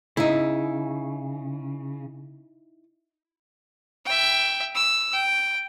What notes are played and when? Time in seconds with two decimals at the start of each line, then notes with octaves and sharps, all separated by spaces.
0.17 C#3 D#4 E4
4.06 E5 G5
4.75 E6
5.13 G5